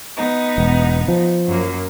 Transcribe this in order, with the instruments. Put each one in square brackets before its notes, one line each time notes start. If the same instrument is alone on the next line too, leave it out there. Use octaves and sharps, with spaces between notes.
[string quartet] B3 D#4
[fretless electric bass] E1
F3
[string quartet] F#2 A#3